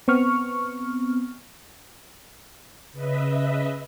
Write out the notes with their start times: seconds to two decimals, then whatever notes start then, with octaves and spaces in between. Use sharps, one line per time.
0.08 B3 C4 C#6 F6
2.92 C#3 B4 D#5 E5